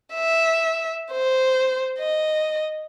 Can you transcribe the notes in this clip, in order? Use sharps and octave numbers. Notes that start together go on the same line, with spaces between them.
E5
C5
D#5